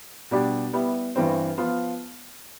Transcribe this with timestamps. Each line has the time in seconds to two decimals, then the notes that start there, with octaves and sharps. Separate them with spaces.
0.31 B2 G3 D4 G4
0.73 G3 B3 E4
1.15 G2 E3 G3 C4
1.57 F3 B3 F4